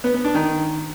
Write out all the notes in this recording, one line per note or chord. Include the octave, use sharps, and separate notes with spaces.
B3
B3
D4
D#3